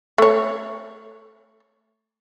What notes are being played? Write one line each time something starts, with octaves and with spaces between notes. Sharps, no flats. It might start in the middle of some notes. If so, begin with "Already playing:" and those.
A3 C#5